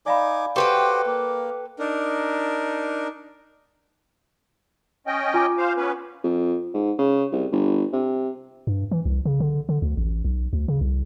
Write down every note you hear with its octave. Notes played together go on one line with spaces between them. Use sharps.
D#4 D5 F5 G#5 B5 D6
F#4 G4 A4 B4 C5 G5
A#3
D4 D#4 A#4
C#4 D#5 G5
F4 G#5 D6
C5 F5
B3 C#4 B4
F2
G#2
C#3
C2
G1
C3
G2
E3
C2
C#3
D3
D3
D2
A1
B1
D2
C#3
C2